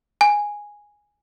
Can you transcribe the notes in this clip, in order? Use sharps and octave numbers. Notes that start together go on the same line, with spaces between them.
G#5